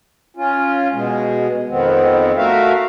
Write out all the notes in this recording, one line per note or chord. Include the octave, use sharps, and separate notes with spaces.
C#4 F4
B2 G#3
F2 D#3 B3 C4
A3 F#4 A#4 E5 F5